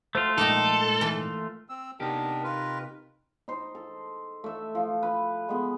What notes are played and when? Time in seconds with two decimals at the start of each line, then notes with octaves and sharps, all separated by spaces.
0.15 A3 F4 F#4 C5
0.38 A#1 G#2 A#3 D#4 A4 G5
1.01 E3
1.69 C4 E6
2.00 C3 B3 D4 D#4 G4 A#4
2.44 F4 A#4 B4
3.48 D#4 C5
3.75 A4
4.44 A3 E5
4.75 F3
5.03 B4
5.49 G#3 B3